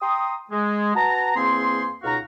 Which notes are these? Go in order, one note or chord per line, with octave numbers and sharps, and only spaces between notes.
G5 A#5 C6 D#6
G#3
F#4 B4 A5 A#5
E2 A#3 C4 G#4 C5 C6
C#2 B2 D#4 F#4 F5 A#5